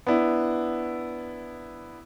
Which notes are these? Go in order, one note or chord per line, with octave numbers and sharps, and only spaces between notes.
B3 D4 E4